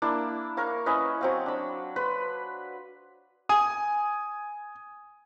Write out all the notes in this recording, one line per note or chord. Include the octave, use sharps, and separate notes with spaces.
A#3 D4 E4
A#4 C#5 F5
C#4 E4 B4 D#5
F#3 C4 F5
D4 B5
B4 B5 C6
G#5 D#6